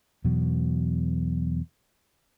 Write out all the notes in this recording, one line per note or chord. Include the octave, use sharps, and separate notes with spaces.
E2 B2 F#3